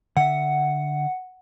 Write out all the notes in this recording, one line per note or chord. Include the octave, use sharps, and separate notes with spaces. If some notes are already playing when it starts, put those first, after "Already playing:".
D3 E5 F#5